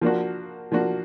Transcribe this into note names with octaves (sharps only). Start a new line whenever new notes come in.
F3 A#3 D4 F#4
F3 A#3 D4 F#4